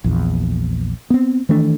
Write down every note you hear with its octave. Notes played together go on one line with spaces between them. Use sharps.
A#1 E2
B3 C4
D#3 E3 A3 D4